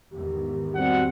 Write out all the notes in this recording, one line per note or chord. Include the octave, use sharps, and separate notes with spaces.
E2 G#2 D#3 G4
G3 C4 F#4 F#5